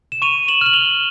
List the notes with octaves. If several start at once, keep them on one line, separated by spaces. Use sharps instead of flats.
E7
C#6 D#7 F7
E7 F#7
F6 F#7
F7 G7